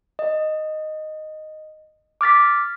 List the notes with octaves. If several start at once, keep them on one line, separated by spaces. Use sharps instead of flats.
D#5
D6 F6 A6 B6